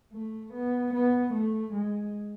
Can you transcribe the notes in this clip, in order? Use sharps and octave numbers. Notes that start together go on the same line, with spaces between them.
A3
B3
B3
A3
G#3